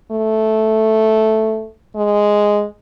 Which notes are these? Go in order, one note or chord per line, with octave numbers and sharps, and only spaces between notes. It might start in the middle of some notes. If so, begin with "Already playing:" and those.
A3
G#3